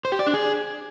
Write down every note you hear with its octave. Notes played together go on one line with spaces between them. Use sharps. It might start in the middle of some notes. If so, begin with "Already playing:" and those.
C5
G4
D5
D4
G#4